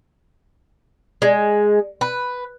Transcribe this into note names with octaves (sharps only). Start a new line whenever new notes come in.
G#3
B4